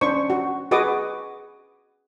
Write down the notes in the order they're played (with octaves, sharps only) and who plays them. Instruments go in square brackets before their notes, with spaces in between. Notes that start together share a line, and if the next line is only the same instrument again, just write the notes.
[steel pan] C#4 D4 C5 C#6
F#4
F#4 G#4 B4 D#5 D6 D#6